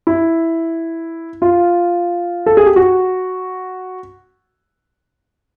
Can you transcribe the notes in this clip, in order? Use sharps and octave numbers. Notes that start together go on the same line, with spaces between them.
E4
F4
A4
G#4
G4
F#4